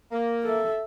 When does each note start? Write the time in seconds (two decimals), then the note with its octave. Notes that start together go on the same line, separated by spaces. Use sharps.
0.12 A#3
0.44 A4 E5